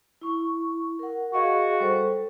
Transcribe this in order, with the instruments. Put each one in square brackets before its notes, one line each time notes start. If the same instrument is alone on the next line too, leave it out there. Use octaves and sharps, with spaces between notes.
[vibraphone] E4 C#6
A#4 F#5
[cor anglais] F#4 [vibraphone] G#4 D#5 F5
[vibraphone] G3 A4 C5